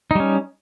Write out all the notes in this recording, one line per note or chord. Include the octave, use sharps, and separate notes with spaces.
G3 C#4 D#4